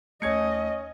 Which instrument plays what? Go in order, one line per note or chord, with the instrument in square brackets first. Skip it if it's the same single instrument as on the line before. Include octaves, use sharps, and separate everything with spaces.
[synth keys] D#2 A3 [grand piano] C#4 G#6 C#7 [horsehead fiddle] D#5